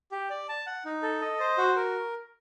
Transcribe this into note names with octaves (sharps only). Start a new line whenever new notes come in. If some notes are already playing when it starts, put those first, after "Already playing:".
G4
D5
A5
F#5
D#4
A4
D#5
C5
F#4
A#4